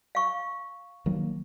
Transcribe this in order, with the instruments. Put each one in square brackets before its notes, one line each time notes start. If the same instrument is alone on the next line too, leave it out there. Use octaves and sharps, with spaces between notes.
[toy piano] F5 C#6
[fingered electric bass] D#3 F#3 A#3